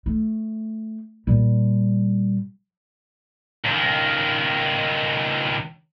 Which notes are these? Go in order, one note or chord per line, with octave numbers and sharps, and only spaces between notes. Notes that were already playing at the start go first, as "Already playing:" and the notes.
A3
A#2 G3
C#2 D#3